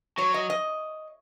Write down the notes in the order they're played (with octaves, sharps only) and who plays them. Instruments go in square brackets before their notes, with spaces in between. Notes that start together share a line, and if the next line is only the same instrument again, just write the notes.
[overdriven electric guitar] F#3 [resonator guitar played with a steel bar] C#5
[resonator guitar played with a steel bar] D#5
D#5